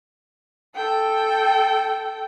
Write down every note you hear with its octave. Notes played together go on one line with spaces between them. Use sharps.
A4 G5